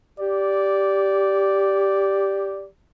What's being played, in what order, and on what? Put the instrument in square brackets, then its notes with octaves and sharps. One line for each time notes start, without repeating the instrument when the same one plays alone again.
[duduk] G4 [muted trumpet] D5